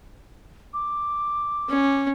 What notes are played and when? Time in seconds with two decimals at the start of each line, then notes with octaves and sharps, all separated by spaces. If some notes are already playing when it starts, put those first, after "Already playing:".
0.74 D6
1.70 C#4